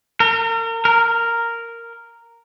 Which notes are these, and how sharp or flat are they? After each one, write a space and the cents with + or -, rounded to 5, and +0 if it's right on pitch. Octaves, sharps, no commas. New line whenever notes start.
A#4 -35
A#4 -5